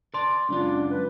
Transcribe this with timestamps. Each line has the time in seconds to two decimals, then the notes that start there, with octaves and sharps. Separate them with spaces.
0.14 D5 A5 C6
0.49 C#2 F#2 D4 F4
0.90 B4